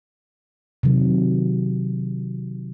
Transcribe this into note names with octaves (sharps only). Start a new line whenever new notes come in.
C3 D#3 F#3